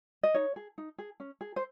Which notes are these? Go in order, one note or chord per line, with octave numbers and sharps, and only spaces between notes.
D#5
D#4 C#5
G#4
D#4
G#4
C#4
G#4
C5